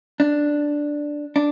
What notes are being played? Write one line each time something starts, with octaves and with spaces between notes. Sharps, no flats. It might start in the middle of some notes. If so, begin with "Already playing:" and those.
D4
D4